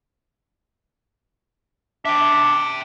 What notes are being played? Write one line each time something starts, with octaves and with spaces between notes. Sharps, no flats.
D4 E5 G5